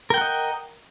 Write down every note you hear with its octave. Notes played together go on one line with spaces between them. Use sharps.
A#4 D#5 F#5 G5